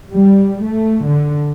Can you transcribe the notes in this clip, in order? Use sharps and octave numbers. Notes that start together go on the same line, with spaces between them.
G3
A3
D3